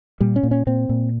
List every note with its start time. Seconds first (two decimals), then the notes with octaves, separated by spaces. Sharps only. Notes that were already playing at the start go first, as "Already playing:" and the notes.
0.20 A#2 G3
0.36 C#4
0.43 A#2
0.51 C#4
0.67 A#2 C4
0.89 A#2